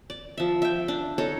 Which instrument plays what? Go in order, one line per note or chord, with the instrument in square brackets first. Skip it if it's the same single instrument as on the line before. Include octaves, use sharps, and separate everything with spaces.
[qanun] D5
F3 E5
E5 G5
D4
D#4 A4 C#5